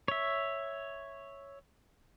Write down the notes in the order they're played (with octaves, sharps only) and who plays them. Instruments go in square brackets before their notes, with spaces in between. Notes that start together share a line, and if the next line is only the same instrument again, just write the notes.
[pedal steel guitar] C#5 E5